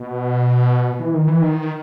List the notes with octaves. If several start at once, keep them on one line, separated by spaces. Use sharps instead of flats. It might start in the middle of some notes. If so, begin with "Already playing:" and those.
Already playing: B2
E3
D#3
E3
D#3